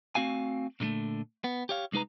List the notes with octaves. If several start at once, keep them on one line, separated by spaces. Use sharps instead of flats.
A3 C4 F#4 F5 G#5
A#2 D3 F3 A3
B3
G4 C#5 F5
C2 G#3 D#4 B4 A#5